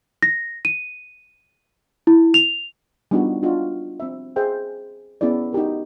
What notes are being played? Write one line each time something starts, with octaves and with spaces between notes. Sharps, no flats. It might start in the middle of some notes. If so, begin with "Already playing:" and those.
A#6
D#7
E4
F7
G3 B3 D4 D#4 F4 F#4
D4 F4 F#4 D#5
C4 E5
G#4 C5 E5 G5
B3 C#4 E4 G#4 D5
D#4 F#4 G4 A#4